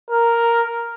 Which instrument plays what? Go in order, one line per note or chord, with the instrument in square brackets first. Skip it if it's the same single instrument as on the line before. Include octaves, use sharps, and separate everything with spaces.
[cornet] A#4